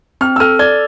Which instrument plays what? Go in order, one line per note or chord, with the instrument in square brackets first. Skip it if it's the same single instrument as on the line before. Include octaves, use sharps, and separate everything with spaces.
[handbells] C4 [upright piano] F6
[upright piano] E6
[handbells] A4 [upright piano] F6
[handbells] D5 [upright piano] G#6